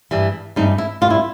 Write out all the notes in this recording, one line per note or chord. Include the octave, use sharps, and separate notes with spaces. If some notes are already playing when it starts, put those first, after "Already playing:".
G2 E3 G3
G2 E3 G3 D#4
E4
A#2 G3 F4
E4